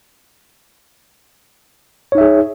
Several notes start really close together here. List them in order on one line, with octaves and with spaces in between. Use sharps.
C#5 D#4 E5 G#4